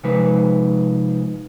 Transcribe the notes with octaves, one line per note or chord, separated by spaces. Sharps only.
C3 F3 G#3 D#4 B4